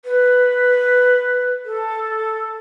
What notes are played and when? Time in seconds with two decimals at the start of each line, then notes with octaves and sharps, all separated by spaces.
0.05 B4
1.65 A4